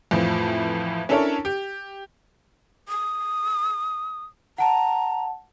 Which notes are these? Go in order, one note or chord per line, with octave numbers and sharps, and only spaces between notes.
F2 A2 E3 F3
C#4 D4 E4 A4 A#4 C#5
G4
D#6
F#5 A5 A#5